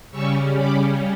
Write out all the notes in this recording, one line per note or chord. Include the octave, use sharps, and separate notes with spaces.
C#3 G3 C#4 C#6 E6
B5 D6